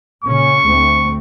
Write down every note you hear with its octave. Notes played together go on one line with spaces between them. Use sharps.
A#2 C#3 C#4 C#6
D2 A3 C4